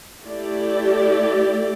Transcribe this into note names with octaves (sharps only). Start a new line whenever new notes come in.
A3 E4 G4 D5